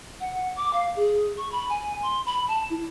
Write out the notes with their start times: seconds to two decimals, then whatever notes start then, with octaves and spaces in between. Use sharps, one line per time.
0.20 F#5
0.56 D6
0.73 F5
0.96 G#4
1.37 C#6
1.52 B5
1.70 G#5
2.02 C6
2.26 B5
2.48 A5
2.70 E4